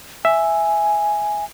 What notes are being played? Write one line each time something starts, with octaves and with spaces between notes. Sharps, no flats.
E5 G#5